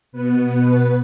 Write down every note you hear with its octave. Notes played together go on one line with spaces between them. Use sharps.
B2 B3 B4
B4